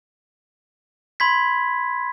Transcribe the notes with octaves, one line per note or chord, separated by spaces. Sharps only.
B5 C6 G#6 B6